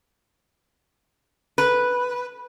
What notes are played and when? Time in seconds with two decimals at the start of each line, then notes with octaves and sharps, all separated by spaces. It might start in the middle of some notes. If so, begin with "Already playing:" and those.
1.58 B4